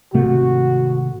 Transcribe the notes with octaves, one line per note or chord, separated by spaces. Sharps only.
G#1 C3 A3 F#4